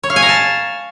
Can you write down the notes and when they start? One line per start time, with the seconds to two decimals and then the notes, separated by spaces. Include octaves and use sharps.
0.03 C#5
0.10 F5
0.16 G#5
0.22 A#5
0.29 A5